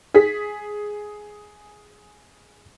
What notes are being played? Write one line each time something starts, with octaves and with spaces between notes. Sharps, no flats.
G#4 B6